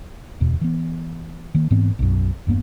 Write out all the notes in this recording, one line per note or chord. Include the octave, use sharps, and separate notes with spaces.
D1 E2 B2
E3 B3
D#3 A#3
G#2 E3 B3 C4
B1 F#2
E1 G2 A#3 B3